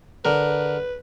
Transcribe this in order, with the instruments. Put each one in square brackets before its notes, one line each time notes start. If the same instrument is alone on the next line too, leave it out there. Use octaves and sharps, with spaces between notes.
[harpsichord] D3 A#4 [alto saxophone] B4